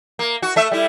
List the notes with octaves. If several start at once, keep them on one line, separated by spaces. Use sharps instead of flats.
A#3
F#4
A3 E5
G3 E4